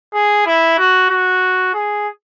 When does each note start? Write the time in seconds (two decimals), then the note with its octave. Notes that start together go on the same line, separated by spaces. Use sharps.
0.14 G#4
0.46 E4
0.78 F#4
1.10 F#4
1.74 G#4